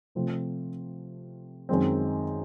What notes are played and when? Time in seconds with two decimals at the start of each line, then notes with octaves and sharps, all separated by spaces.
0.15 C3 F3 A3 C4 F4
1.69 F#2 D#3 G#3 C4